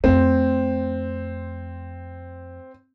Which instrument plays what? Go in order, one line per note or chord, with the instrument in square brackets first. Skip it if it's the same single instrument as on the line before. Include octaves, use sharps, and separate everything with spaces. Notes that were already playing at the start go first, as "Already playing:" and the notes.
[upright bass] F2 A3 [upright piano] C4